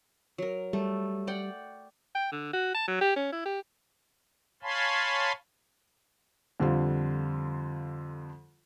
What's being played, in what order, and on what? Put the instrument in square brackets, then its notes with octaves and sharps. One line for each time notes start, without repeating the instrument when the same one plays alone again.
[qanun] F#3 A#4
[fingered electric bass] G3 [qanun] A3
[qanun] D5 F#5 G5
[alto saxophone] G5
D3
F#4
A5
F#3
G4
C#4
E4
G4
[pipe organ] C#5 F5 G#5 A5 B5 C6
[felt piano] F2 D3 G3 F4